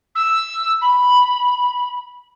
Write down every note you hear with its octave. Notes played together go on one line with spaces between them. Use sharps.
E6
B5